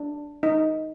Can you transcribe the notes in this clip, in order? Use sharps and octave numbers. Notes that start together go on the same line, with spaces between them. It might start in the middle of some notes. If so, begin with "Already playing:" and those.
Already playing: D4
D#4